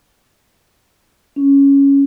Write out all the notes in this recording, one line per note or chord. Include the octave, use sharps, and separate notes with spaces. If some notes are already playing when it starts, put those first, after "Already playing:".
C#4